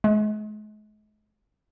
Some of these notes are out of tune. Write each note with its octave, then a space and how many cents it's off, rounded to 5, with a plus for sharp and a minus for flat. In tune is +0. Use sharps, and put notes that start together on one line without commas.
G#3 +40